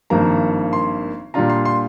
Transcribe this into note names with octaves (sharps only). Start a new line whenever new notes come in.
G#1 G2 F3 A#3 A#5
C6
A#2 G3 D4 F4 A#5
C6
C6